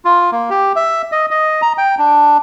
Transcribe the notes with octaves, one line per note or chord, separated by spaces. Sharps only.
F4
A#3
G4
E5
D#5
D#5
A#5
G5
D4